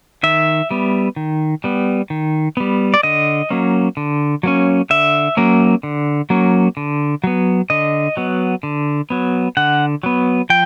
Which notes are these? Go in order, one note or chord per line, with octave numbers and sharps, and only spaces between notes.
D#3 E5
G3 B3
D#3
G3 B3
D#3
G3 B3
D5
D3 D#5
F#3 A#3 C#4
D3
F#3 A#3 C#4
D3 E5
F#3 A#3 C#4
D3
F#3 A#3 C#4
D3
F#3 B3
D3 D#5
F#3 B3
D3
F#3 B3
D3 F#5
F#3 B3
F3 G5